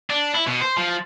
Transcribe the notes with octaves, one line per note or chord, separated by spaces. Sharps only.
D4
E4
B2
C5
F3